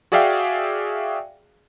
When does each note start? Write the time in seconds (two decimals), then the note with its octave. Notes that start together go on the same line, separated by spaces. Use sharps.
0.12 F#4 G#4 D5 E5 F5 G5